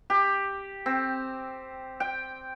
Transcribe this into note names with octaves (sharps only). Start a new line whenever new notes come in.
G4
C4
G5